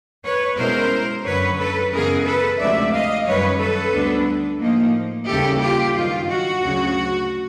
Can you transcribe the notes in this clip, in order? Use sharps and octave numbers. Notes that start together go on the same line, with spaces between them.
B4 C#5
B2 G#3 C#4 E4 A#4 C5
F#2 D3 F#3 B4 C#5
A4 B4
F#2 C#3 E3 G#3 B3 G#4 A#4
A4 B4
D2 C3 F3 G#3 C#4 D5 E5
D#5 F5
F#2 D#3 G3 B4 C#5
A4 B4
D2 D3 G3 B3 D4
A2 F3 A#3 D#4
D#2 C#3 E3 G3 G4 A4
F4 G4
G2 D#3 F#3 F4
F#4
D2 C#3 F#3